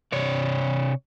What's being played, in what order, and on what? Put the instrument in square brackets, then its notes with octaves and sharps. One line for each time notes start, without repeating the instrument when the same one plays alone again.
[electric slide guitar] C3 C#5 D5